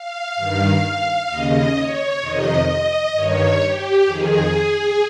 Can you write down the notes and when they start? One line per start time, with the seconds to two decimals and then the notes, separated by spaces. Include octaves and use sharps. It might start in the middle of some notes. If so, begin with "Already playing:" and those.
Already playing: F5
0.36 G2 D#3
1.29 D#2 C#3 D#5
1.75 C#5
2.21 F2 C3 D#3 D#5
2.67 D#5
3.13 G2 D#3 C#5
3.59 G4
4.05 F2 D#3 G#4